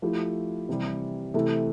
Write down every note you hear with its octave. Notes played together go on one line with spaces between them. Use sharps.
F3 A3 E4 G4
C3 E3 G3
C3 E3 A3 E4 A4